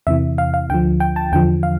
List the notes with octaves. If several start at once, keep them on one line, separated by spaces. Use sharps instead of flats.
E2 C3 E3 E5
F5
F5
D2 D3 F3 G5
G5
A5
E2 D3 F3 G5
F5